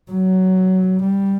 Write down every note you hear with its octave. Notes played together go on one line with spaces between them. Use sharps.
F#3
G3